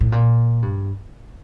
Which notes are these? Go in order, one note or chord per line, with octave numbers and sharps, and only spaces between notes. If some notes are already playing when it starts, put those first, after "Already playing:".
A2
A#2
G2